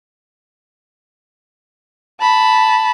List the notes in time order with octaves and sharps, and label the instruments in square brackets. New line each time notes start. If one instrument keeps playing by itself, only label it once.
[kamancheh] A5 B5